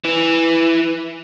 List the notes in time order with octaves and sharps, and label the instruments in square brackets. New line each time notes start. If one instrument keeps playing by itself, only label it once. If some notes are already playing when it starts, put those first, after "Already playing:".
[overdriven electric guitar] E3